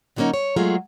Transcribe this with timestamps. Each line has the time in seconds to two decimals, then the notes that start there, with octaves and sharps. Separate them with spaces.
0.16 D3 F#3 G3 A#3 C#4 D#4
0.34 C#5
0.56 F#3 G#3 A3 F4 G#4